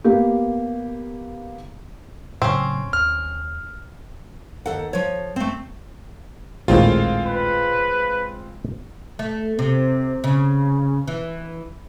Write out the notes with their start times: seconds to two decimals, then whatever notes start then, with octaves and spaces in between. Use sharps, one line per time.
0.04 A#3 B3 G4
2.42 A2 C#3 F#3 C4 C#4
2.93 D#2 F6
4.66 D#2 A4 F#5
4.93 F3 C#5
5.36 A3 C4
6.68 A#1 D#2 A2 G#3 C4 F4
7.26 B4
9.19 A3
9.59 C3
10.24 C#3
11.08 E3